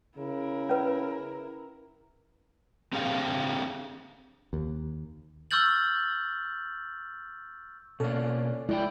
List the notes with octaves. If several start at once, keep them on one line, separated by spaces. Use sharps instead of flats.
C#3 E4 A#4
C#4 B4
C4 D4 G4 G#4 F5
D#2
C#6 E6 F6 G6 A6 F#7
B2 A#3 C#4 D4 A4
G#3 D4 E4 D5 G5